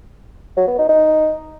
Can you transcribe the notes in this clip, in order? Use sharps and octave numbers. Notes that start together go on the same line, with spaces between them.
F#3
B3
D#4
D#4